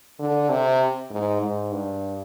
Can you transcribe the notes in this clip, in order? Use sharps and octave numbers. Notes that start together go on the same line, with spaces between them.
D3
C3
G#2
G#2
G2